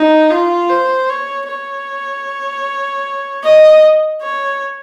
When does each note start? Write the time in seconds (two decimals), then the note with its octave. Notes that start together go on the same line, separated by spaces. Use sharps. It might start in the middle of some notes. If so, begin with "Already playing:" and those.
Already playing: D#4
0.31 F4
0.69 C5
1.10 C#5
1.48 C#5
3.44 D#5
4.22 C#5